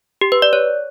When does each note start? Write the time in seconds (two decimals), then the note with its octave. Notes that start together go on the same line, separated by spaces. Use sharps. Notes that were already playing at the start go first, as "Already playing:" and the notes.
0.21 G4
0.32 B4
0.42 D5
0.53 C#5